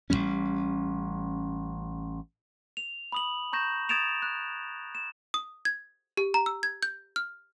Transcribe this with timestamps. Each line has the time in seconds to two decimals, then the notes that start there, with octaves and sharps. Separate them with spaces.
0.10 A1 E3 G3 C#4
2.77 F7
3.12 B5 D#6 F#7
3.53 A#5 C#6 G6 A#6 E7
3.89 D#6 G#6 A6 D7 E7 F7
4.22 F#6
4.95 E7
5.34 D#6
5.65 G#6
6.17 G4
6.34 A#5
6.46 E6
6.63 G#6
6.83 G6
7.16 F6